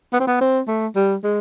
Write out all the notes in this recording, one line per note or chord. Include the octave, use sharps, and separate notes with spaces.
B3
C4
B3
C4
A3
G3
G#3